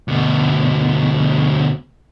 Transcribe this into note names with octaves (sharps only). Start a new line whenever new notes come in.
D2 B2